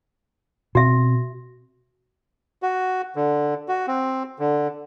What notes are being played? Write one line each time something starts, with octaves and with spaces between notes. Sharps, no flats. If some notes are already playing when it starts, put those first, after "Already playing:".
B2 C4 F#4 E5
F#4
D3
F#4
C4
D3